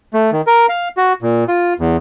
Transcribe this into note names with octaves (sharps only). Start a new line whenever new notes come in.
A3
D#3
A#4
F5
F#4
A#2
F4
E2